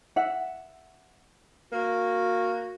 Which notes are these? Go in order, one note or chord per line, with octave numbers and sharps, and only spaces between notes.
E5 F#5
A#3 F#4